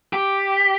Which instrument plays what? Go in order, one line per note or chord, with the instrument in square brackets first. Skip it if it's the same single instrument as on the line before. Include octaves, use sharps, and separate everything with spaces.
[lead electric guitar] G4